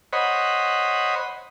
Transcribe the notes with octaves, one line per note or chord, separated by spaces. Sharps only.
C5 C#5 D#5 F#5 B5